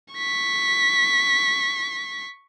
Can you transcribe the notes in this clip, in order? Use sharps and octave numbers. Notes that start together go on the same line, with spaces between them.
C#6 B6